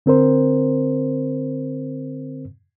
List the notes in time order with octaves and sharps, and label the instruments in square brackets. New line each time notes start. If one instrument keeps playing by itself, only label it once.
[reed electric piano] D3 C4 A#4 C5